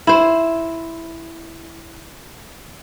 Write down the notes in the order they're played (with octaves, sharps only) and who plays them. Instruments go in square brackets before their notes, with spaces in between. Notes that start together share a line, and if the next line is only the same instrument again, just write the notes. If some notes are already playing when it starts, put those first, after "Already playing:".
[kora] E4 C5